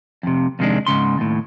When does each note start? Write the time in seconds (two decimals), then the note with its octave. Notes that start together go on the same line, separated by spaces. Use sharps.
0.23 F2 C3
0.59 F2 C3 D#3 G3 G#3 D4
0.87 G#2 C#3 C6
1.18 D#2 A2